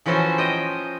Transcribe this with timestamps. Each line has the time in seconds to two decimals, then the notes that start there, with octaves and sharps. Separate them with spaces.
0.06 E3 F3 C#4 F#4 A4 C5
0.38 D#5 G5